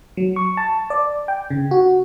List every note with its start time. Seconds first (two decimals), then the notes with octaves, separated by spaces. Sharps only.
0.17 F#3
0.36 C#6
0.57 A5
0.90 D5
1.28 G5
1.50 C#3
1.71 F#4